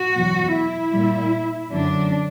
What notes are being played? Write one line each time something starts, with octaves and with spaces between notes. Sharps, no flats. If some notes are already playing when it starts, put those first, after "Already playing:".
Already playing: F#4
E2 B2 F#3
E4
A#2 G3
F#2 D3 F#3 D4